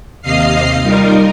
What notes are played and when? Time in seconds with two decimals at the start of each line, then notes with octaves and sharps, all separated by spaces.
0.21 D#2 C3 D#5 F5 F6 C7
0.82 G3 D#4 F4 A#4